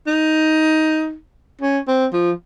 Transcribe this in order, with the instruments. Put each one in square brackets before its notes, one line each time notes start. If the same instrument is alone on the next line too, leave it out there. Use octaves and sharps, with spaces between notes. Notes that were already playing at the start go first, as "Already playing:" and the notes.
[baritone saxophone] D#4
C#4
C4
F3